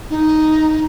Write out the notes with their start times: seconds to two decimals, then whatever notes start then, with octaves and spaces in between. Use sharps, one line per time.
0.10 D#4